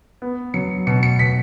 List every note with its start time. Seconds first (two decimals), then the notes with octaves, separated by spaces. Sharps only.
0.22 B3
0.54 F#3 C#7
0.87 B2 C#7
1.03 C#7
1.19 B2 B6